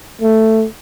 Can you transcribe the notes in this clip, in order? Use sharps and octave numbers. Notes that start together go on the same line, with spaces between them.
A3